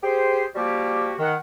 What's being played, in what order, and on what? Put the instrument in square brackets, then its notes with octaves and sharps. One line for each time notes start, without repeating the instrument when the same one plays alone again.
[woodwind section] G4 G#4 C5
F3 G3 A#3 F#4 G4
D#3 F#5